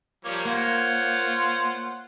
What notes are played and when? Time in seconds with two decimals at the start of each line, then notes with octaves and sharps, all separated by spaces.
0.25 F3 G3 A#3 C#5
0.45 A#3 F4 C5 F#5